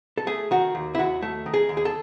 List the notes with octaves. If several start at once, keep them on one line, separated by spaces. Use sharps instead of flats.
A4
A3 G#4
D#3 F#4
D#2
E4
D#2 F#4
A3
D#3
G#4
D#2
G#4
A4